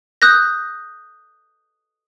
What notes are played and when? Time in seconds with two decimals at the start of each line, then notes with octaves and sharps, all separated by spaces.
0.22 D#6 F#6 G6 A#6